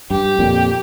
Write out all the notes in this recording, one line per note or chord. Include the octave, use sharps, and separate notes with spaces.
G2 G4
F2 A#2